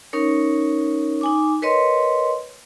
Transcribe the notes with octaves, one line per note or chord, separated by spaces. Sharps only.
C#4 D#4 A#4 C#5
D#4 G#5 D6
A#4 B4 C#5 D#5 C6